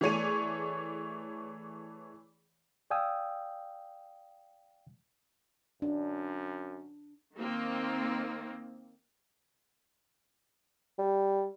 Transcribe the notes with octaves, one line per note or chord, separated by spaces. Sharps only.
E3 A3 G#4 C#5 D5 D#7
D5 F5 G5 G#5 D#6 E6
F#2 D4
D#3 A#3 C4
G3